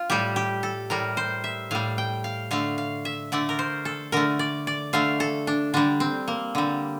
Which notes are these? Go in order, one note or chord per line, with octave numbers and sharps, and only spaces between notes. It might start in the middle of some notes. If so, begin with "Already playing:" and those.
Already playing: F4
A2 G3 G4
G4
A4
A2 G3 A#4
C5
E5
A2 G3 F5
G5
F5
D3 A3 F5
F5
E5
D3 A3 D5
A#4
C5
A4
D3 A3 A#4
D5
D5
D3 A3 F5
A4
D4
D3 G3 D4
C4
A#3
D3 G3